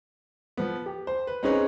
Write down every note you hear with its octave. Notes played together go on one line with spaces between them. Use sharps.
F3 B3
G4
C5
B4
C4 C#4 D#4 G#4 B4 C#5